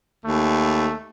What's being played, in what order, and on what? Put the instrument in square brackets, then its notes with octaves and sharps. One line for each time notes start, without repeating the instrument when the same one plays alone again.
[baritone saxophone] D#2 [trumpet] A3